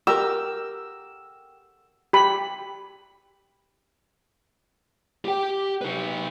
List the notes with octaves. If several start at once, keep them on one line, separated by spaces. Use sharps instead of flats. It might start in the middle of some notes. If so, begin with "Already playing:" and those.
G4 A#4 E6
G4 B5
G4 G5
D#4 B4